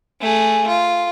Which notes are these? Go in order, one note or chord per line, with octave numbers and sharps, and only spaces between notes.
A3 G#4
F4